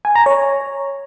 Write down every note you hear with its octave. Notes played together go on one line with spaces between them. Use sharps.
G#5
A#5
C#5